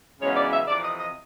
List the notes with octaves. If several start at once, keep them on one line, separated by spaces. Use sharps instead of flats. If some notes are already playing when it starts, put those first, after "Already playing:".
F#2 C#3 E3 G#3 B3 C#5
D5
E5
F2 C3 E3 D5
D#5
D#5